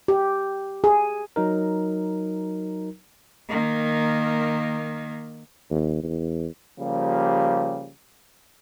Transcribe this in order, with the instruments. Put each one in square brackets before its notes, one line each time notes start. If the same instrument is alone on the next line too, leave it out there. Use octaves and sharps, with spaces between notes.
[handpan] G4
G#4
[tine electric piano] F#3 D#4 A#4
[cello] D#3 A#3
[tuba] D#2
E2
[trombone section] C#3 F3 G3 A#3 G4